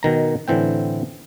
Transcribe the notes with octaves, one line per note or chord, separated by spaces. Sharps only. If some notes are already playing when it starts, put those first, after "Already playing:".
B2 D#3 A#5
A2 D3 E3 C4 G5